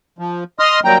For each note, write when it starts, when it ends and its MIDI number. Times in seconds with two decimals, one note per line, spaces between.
0.19 0.44 53
0.59 0.80 75
0.59 0.80 84
0.59 0.80 87
0.59 0.80 89
0.85 0.98 54
0.85 0.98 55
0.85 0.98 58
0.85 0.98 79
0.85 0.98 82